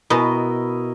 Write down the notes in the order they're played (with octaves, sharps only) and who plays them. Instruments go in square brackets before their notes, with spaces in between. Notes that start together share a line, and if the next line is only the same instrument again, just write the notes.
[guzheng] B2 [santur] E4 A#4 D#5